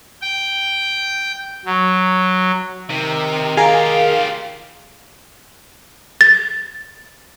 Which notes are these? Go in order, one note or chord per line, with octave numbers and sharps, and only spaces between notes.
G5
F#3
C3 D#3
F4 G4 G#4 A#4 F5
A6